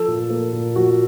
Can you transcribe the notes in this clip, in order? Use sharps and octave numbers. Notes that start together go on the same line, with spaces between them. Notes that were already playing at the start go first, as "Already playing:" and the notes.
Already playing: F3 A4
A#2
A#3
A#2
F3 F#4